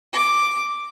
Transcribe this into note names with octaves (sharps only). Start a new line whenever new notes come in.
D6